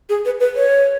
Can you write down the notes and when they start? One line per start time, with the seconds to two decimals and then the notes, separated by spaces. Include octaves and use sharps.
0.09 G#4
0.25 B4
0.40 B4
0.56 C#5